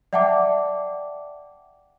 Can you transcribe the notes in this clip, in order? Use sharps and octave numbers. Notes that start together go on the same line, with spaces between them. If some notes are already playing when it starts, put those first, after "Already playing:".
D5 E5 F#5 G5 A5 D6